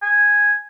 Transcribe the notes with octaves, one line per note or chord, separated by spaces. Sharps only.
G#5